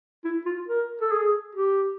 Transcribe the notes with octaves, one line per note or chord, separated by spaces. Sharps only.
E4
F4
A#4
A4
G#4
G4